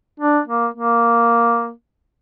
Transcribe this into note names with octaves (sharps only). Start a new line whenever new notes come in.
D4
A#3
A#3